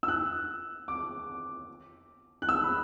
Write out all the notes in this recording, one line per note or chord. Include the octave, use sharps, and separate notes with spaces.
E6
F#6
D6
F#6
E6
B5